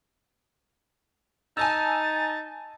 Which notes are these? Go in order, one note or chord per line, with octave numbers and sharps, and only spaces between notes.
D#4 G#5 A5 E6 A6